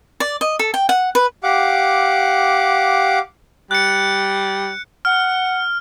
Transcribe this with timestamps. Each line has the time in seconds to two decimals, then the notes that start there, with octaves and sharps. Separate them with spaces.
0.20 D5
0.41 D#5
0.59 A4
0.74 G5
0.89 F#5
1.15 B4
1.43 G4 F5 F#5 D6
3.71 G3 F#6 C#7
5.05 F#5 F6